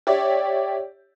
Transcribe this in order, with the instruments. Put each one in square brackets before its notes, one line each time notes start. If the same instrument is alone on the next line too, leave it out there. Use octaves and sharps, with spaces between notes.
[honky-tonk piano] G4 C#5 D5 E5